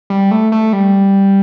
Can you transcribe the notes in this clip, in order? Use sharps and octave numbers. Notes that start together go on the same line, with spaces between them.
G3
A3
A3
G3